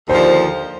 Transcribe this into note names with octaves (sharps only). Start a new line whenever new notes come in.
D#2 D3 F3 C5